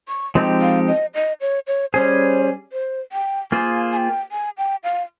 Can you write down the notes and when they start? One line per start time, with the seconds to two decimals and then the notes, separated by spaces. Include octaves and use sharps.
0.08 C#6
0.35 F3 G#3 C4 D#4 G4
0.61 F5
0.87 D#5
1.15 D#5
1.41 C#5
1.67 C#5
1.93 G3 C#4 G#4 C5
2.73 C5
3.12 G5
3.52 A#3 F4 G#4 C5 G#5
3.92 G#5
3.97 G5
4.32 G#5
4.58 G5
4.84 F5